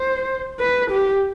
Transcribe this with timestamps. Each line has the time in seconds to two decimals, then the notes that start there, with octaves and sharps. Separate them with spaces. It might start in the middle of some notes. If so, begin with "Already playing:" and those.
Already playing: C5
0.60 B4
0.91 G4